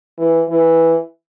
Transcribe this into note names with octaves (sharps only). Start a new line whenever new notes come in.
E3
E3